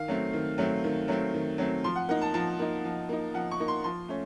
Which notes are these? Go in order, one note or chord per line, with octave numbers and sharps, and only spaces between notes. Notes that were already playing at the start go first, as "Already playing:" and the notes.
Already playing: D#3 F5
F#3 A3 C4
D#3
F#3 A3 C4
D#3
F#3 A3 C4
D#3
F#3 A3 C4
F3 C6
F#5
A#3 D#4 F#5
A5
F3 A5
A#3 D#4
F3
A#3 D#4
F3 F#5
C#6
A#3 D#4
C6
F3 C6
A3 C#4